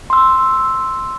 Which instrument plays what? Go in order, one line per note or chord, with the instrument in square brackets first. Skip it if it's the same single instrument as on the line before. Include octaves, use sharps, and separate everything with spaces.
[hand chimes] C6 E6